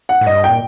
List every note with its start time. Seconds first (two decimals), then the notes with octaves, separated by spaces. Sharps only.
0.09 F#5
0.21 A2
0.26 G2 D#5
0.44 A#2 G5